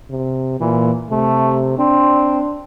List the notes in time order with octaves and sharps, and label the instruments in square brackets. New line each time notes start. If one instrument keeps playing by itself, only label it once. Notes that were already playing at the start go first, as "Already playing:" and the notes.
[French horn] C3
[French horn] A#2 [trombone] E3
[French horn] C3 [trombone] A3
[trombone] C4 [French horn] D4